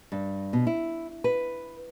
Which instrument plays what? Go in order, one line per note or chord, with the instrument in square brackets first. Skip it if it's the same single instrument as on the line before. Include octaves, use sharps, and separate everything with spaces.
[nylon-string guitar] G2
B2
E4
B4